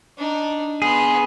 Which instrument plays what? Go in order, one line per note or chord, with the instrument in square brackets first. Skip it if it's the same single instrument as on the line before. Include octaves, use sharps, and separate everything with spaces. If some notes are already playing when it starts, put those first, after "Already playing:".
[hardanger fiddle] D4 D#4
[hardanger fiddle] B3 C6 [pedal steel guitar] G#4